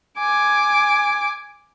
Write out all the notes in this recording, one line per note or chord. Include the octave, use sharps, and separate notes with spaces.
G#5 D6